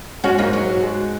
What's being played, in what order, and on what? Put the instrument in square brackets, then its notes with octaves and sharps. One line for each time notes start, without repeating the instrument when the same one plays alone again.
[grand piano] G#3 [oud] C#4 F#4
[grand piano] G#2 [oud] A#3 D#4
[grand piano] G#2 [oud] F#3
[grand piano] F#4
G#3